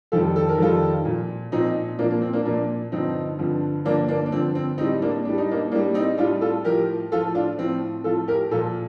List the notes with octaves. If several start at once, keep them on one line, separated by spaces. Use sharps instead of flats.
F2 D#3 G3 F4 A4
A4
A#4
F2 D#3 G3 F4 A4
A#2 F3
A#2 F3 C4 D#4
A#2 F3 A#3 D4
A#3
C4
A#3 D4
A#2 F3 A#3 D4
G2 D3 F3 C4 D#4
G2 D3 F3
G2 D3 F3 A#3 D4
A#3 D4
D4
G2 D3 F3 C4
C4
A2 G3 C4 D#4
A#3 D4
A2 G3 D4
D#4
A#3 D4
A2 G3 A#3 D4
C4 D#4
A2 G3 D4 F4
F4 A4
A2 F3 G4 A#4
A2 F3 F4 A4
D4 F4
A2 F3 C4
A2 F3 F4 A4
G4 A#4
A#2 F3 F4 A4